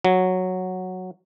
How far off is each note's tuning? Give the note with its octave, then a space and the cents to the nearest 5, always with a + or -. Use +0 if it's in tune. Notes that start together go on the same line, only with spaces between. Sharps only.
F#3 -5